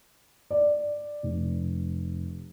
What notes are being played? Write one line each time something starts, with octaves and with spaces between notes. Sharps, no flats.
D5
F1